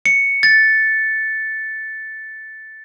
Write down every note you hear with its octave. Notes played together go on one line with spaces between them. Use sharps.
C#7
A6